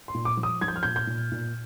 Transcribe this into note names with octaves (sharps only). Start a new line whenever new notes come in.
C6
A#2
D6
F3
D#6
F3 G#6
G6
F6
A#2 G6
G6
A#2
A#2